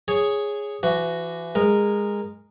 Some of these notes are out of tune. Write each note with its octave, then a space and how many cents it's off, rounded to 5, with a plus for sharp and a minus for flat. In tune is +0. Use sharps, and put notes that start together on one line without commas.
G#4 -5 C#5 +0
E3 +35 F#4 +5
G#3 -20 A#4 -5